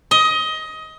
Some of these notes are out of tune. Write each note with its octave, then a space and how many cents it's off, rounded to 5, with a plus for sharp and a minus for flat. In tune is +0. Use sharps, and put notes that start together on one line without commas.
D#5 +20